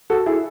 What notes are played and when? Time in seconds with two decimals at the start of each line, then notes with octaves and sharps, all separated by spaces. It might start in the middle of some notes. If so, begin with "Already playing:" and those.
0.10 F#4 A4
0.26 E4 G#4